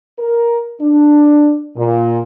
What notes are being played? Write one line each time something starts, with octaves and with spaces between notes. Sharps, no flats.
A#4
D4
A#2